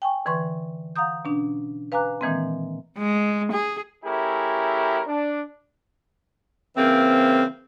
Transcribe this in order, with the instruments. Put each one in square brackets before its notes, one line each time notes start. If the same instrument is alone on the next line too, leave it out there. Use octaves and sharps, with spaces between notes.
[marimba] G5 G#5 C#6
D3 E3 B4 C6 C#6
F5 F#5 A#5 D#6 G6
B2 C#4 D4
B4 F5 G#5 A#5 D6 F#6
A#2 D#3 E3 G#3 A#3 C4
[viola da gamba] G#3
G#4
[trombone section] A3 C#4 E4 G4 G#4 A#4
D4
[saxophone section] C#3 E3 A#3 C4